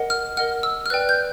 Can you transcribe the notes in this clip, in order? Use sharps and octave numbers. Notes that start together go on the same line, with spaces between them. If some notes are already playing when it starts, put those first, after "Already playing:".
Already playing: A#4 D#5 F#5
F6
A#4 D#5 F#5 F6
E6
F6
B4 D5 G5 F#6
G6